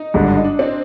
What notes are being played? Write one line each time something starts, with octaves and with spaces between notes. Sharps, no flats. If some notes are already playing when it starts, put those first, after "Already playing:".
Already playing: D#4
G#1 G2 D3
D#4
D4
C4